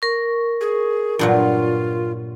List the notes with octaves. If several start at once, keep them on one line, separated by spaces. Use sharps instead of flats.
A#4 C#6
G#4
G2 A#2 F#3 F4